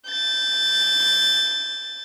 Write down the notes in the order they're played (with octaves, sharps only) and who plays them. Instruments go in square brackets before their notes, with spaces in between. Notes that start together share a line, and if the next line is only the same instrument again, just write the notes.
[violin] G6 A6